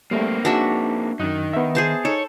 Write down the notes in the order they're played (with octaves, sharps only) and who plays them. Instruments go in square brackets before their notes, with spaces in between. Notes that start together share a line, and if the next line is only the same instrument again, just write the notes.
[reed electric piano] G3 A3 [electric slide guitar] A#3 C4
[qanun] D4 F#4 E5 [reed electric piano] D#4 G#4 A5
[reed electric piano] F#2 D#6 F#6 [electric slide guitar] D#3 D#4
[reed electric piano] B3 E5
[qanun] G#4 C5 A5
[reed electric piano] D#4 [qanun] A4 [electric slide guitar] C#5